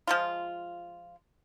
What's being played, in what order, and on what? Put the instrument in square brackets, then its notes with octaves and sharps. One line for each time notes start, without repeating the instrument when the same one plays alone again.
[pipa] F3 G#3 F4